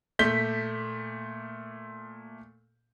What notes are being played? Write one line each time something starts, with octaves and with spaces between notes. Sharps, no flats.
A#2 A3 G6 B6 G7